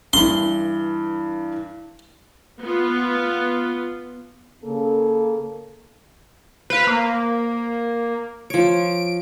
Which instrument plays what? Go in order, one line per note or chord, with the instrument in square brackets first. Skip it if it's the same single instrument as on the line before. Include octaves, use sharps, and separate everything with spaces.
[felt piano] G2 E3 [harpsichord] C6
[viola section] B3 F4
[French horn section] C#3 A#3 A4
[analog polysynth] B4 F5 [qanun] C5
[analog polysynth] A#3
[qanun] F3 C#5 [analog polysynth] D7